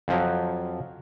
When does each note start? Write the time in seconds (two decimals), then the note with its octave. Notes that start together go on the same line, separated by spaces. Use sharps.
0.08 F2 F3 F#3